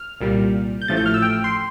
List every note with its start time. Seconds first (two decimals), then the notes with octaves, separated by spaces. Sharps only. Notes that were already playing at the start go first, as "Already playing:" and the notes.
Already playing: F6
0.21 C2 A#2 G3
0.82 G6
0.88 A1 A2 F3 A3 A6
0.97 G6
1.06 F6
1.14 E6
1.22 G5
1.44 C6